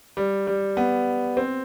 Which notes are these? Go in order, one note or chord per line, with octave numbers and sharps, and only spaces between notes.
G3
G3
B3
C4